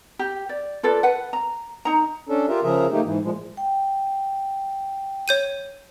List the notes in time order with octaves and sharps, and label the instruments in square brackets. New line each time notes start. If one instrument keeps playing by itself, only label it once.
[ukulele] G4
D5
F4 A4 B4 D5
B4 F#5
A#5
D#4 A#5
[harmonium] C#4 D4 A4
F4 G4 A#4 E5
C#3 F3 G#4 A#4 E5
A3 A#3 D#4 G4
G#2 E3
A#2 F3 G#3
[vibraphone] G5
[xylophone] C#5 G6 D#7